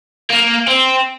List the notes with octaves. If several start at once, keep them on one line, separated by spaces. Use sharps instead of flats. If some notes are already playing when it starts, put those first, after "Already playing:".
A#3
C4